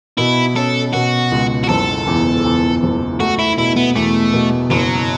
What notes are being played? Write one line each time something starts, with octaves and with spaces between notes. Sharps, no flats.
B2 E4
C#4 A4
B2 F#4
C#2
F#4
F#1 A4
E2
E2
F#1
A3 F#4
E4
B2 E4
B3
E2 A3
B2
F#1 F#3